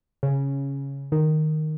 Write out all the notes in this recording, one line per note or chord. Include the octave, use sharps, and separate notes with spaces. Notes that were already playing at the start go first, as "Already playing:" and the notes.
C#3
D#3